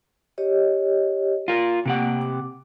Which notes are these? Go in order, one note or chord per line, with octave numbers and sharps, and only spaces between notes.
G4 C#5 D#5
F4 A#4
C3 A#3 G4 F#5
D6